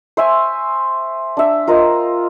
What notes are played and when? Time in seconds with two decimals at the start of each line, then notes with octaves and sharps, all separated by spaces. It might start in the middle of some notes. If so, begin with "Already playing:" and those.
0.17 C5 E5 G#5 C#6
1.37 D4 E5
1.67 F4 A#4 C5 D#5